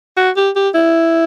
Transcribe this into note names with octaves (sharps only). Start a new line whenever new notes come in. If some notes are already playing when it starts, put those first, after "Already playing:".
F#4
G4
G4
E4